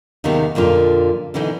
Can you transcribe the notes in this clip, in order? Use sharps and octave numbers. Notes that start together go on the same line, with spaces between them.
D#2 C3 D#3 B3 D#4 G#4
F2 A#2 D3 F4
B2 D3 E3 D#4